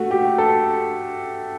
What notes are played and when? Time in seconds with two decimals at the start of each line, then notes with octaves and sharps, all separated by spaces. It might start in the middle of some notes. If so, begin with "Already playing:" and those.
Already playing: A3 F#4
0.11 G4
0.38 A4